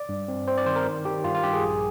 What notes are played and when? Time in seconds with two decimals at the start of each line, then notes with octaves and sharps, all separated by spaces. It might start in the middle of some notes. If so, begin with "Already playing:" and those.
Already playing: D5
0.09 G2
0.28 C4
0.48 C4 C5
0.58 D5
0.66 D#3 C5
0.76 A#4
0.85 D#3
1.05 D#3 G4
1.24 G2 F4
1.35 F4
1.43 G2 G4
1.53 G#4
1.63 A#1